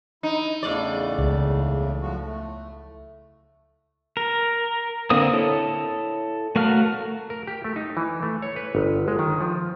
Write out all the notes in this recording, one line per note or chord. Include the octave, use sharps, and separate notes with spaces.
D#4 E4
E2 A2 C#3 D5
C#2
F#2 F3 F#4
A3
A#4
D3 A#3 C4 D#6
E4 A4 C#5
A3 F#4 A#4 F5 F6
A#4
G4
A3
D#4
E3
A3
C#5
B4
G1
G#3
D#3
F3